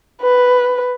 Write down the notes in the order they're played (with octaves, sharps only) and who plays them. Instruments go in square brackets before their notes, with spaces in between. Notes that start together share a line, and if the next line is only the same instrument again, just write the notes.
[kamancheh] B4